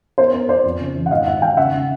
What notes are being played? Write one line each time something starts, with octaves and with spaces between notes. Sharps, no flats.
B3 A#4 C5
B3 A#4 C5
B3 C5 D5
F2
C#3
E3
F#5
G#1 D#5 F5
G#1 E5 F#5
D#3 F5 G5
C#3 E5 F#5
C#3